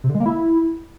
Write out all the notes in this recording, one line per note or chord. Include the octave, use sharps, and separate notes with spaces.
C3
D3
G#3
A#3
E4